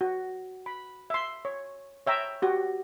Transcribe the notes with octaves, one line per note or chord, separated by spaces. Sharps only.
F#4
B5
E5 C6
C#5
C#5 E5 G5 A#5
F#4 G4